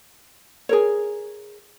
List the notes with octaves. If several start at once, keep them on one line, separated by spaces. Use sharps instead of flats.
G#4 A#4 C#5